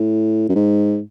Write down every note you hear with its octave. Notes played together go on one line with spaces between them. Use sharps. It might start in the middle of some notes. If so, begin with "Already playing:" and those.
Already playing: A2
F#2
G#2